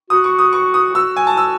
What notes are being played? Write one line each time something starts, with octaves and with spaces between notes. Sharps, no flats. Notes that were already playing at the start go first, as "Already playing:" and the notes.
F#4 D#6
C#6
D#6
C#6
D#6
F#4 E6
G#5
A5
E6